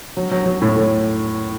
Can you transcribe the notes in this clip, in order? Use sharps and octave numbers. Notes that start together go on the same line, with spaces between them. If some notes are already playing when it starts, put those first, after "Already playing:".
F#3
F#3
F#3
A2
A2